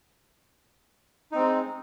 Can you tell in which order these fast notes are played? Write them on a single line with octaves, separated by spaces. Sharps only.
D#4 C4 G#3